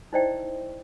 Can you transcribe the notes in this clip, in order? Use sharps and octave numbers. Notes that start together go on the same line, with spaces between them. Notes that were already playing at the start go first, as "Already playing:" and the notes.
D#4 E4 C5 D5 D#5 G5